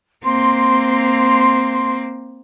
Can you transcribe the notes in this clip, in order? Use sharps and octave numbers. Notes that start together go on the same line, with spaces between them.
A#3 C4 C6